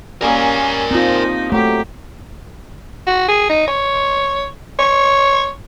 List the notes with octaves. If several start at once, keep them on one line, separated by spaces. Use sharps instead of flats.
G3 A#3 C#4 A#4 G#5 D#6
F3 C4 D#4 F4
F#3 A3 G4 E6
F#4
G#4
D#4
C#5
C#5